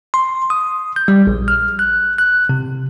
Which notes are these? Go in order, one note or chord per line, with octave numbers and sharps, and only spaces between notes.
C6
D#6
G6
G3
A#1
F6
F#6
F#6
C3